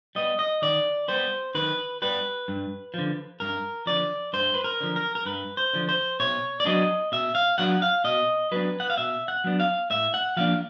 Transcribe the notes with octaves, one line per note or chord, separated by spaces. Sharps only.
G3 B3 D#5
D#5
D#3 D5
G3 B3 C5
D#3 B4
G3 B3 B4
G2
D3 F3
G2 A#4
D3 F3 D5
G2 C5
B4
A#4
D3 F3
A#4
A#4
G2 B4
C5
D3 F3
C5
B2 C#5
D5
F#3 B3 D4 D#5
B2 E5
F5
F#3 B3 D4 F#5
F5
B2 D#5
F#3 B3 D4 B4
F#5
F5
B2 E5
F#5
F#3 B3 D4
F5
A2 E5
F#5
F3 A#3 D4 F5